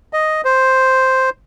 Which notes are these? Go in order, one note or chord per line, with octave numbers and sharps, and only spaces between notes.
D#5
C5